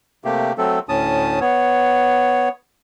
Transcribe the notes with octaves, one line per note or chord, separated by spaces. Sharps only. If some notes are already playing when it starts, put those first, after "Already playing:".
C3 A3 A#3 G4
F#3 A3 C4 A4
D2 A2 C#4 A5 D#6
B3 C#5